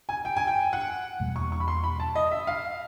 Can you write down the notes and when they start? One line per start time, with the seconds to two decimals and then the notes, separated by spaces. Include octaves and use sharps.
0.09 G#5
0.25 G5
0.37 G#5
0.47 G5
0.73 F#5
1.20 E2 B2 G3 A#3
1.36 C#6
1.52 C#6
1.60 B5
1.68 C6
1.84 B5
2.00 A5
2.16 D#5
2.32 E5
2.47 F5